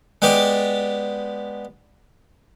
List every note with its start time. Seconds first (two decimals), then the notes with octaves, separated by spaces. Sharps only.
0.22 G#3 B3 G4 D5